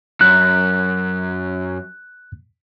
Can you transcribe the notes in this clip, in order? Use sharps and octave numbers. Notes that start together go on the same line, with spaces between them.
F#2 F#6